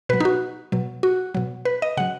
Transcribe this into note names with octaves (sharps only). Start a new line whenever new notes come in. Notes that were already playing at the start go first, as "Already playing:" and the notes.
B2 F#3 B4
D#4
F#4
B2 F#3
F#4
B2 F#3
B4
D#5
C#3 F#3 F#5